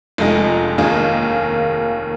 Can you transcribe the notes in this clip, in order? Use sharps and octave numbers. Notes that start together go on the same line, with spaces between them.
F1 F2 F3 G#3 D#4
D#2 D#3 A#3 F4 G#4